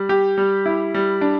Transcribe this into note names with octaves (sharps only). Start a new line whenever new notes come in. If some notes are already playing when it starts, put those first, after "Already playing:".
Already playing: G3
G4
G3
E4
G3
D4